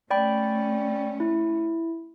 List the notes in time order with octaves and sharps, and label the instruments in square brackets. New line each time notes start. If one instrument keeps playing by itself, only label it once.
[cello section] A3 C#4 [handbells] D5 G5 B5
[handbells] E4